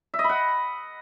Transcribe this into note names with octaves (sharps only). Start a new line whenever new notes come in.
E5
D#5
B5
F#5